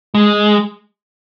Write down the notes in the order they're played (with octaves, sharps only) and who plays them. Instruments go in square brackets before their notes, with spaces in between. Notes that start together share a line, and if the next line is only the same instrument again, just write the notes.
[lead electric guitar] G#3